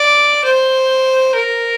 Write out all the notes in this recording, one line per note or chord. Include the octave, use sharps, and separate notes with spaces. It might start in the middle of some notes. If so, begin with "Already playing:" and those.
Already playing: D5
C5
A#4